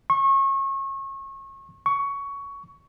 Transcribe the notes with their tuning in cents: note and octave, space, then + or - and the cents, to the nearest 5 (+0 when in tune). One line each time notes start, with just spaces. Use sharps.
C#6 -30
C#6 +15